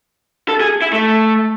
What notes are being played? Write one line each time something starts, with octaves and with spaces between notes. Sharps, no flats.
A4
G#4
E4
A3